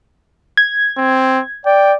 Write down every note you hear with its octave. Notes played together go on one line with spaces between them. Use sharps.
G#6
C4
D5 G5